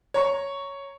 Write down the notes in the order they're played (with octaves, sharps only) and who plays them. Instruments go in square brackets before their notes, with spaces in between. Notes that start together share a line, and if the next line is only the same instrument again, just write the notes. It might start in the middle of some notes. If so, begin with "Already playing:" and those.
[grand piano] C#5 A#5 C#6